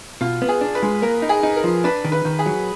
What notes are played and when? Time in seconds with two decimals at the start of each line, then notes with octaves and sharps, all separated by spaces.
0.21 B2 F4
0.42 B3
0.48 G#4
0.61 D4
0.75 B4
0.83 G#3
1.02 A#3 A#4
1.22 D#4
1.29 G#4
1.43 D#4
1.56 A#4
1.64 F3
1.84 D4 B4
2.04 D#3
2.12 B4
2.25 D#3
2.39 G#4
2.46 F#3